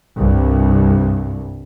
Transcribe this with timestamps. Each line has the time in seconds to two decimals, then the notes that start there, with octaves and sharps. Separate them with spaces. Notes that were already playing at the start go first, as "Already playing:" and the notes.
0.17 C2 G2